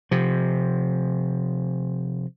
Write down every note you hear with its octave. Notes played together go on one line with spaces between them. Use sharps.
C3 F3